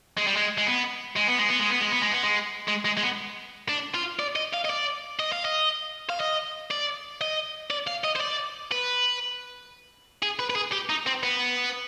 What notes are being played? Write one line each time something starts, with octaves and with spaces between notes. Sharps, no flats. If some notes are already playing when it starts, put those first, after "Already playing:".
G#3
G3
G#3
G#3
B3
G#3
B3
G#3
B3
G#3
B3
G#3
B3
G#3
B3
G#3
G#3
G#3
G#3
B3
D4
F4
D5
D#5
F5
D#5
D5
D#5
F5
D#5
F5
D#5
D5
D#5
D5
F5
D#5
C5
D5
B4
G#4
B4
B4
G#4
G4
D#4
C4
B3